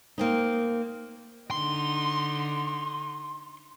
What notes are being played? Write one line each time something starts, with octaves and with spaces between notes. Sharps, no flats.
A#3 C4 D#4
D3 D#4 C6